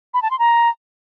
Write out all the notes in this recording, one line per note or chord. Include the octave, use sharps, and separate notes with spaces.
B5
A5
C6
A#5